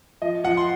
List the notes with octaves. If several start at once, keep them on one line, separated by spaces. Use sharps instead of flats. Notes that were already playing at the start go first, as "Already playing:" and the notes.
F3 D#5
F3 F#5
C6